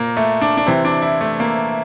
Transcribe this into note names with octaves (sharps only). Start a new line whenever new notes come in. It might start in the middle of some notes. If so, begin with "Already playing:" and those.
Already playing: A#2 A#3
A3
D4
D4
C3 E3 C4
D4
E4
A3
A#3